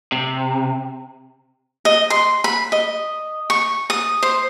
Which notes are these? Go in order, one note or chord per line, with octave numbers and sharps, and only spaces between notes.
C3
D#5
C6
B5
D#5
C#6
D#6
C5